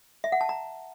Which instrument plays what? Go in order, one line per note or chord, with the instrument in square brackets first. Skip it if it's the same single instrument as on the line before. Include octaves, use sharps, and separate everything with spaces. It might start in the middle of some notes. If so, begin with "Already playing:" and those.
[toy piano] E5
F#5
A5
A#5